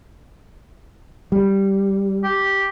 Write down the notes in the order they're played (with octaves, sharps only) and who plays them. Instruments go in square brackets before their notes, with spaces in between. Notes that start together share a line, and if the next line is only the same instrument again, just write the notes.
[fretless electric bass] G3
[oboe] G4